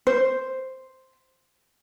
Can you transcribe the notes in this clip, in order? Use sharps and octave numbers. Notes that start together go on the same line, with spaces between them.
C5